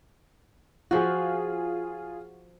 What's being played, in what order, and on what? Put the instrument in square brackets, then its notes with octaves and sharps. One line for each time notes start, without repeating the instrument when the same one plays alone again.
[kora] F3 F#4 [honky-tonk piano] F4 G#4